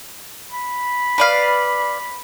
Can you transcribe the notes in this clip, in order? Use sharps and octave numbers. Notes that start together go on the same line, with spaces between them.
B5
B4 D5 F5